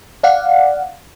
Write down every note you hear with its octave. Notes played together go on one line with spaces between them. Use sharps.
D5 F5 F#5